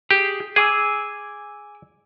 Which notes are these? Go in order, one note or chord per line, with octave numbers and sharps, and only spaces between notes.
G4 G#4
G#4 G#5 D6 E6